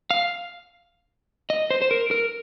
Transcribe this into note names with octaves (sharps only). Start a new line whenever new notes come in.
F5
D#5
C5
C5
A#4
A#4